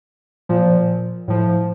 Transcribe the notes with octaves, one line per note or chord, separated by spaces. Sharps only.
A#2 F3
A2 F3